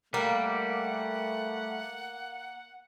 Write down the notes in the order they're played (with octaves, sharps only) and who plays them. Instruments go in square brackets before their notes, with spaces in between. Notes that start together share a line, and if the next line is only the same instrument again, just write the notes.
[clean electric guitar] G3 [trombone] A3 [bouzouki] A#3 [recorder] F#5